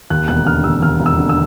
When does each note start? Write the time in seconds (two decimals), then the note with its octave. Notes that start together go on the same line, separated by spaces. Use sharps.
0.10 D#2 F#6
0.28 E1 F#6
0.46 D3 F6
0.64 E1 E6
0.82 D#2 F6
1.00 E1
1.06 E6
1.18 D3
1.29 E6